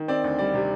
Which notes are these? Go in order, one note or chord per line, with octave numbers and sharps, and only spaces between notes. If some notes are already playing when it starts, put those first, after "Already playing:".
Already playing: D#3
C4 D5
D2
G3 D5
C3